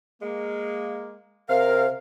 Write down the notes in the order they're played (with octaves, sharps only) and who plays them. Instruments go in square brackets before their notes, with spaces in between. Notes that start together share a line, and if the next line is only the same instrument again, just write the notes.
[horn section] G#3 A#3
[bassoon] C3 [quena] A#4 [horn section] F5